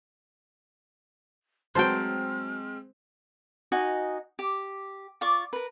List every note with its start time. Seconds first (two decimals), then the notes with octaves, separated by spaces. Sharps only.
1.75 F#3 G#3 C4 C5 G5 A5 C6 F6
3.72 D#4 F#4 D#5 G#5
4.39 G4
5.21 F4 D5 C#6 D6
5.53 A#4 B4